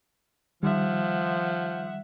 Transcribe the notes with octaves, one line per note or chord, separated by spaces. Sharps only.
D#3 F3 G3 E5 F#5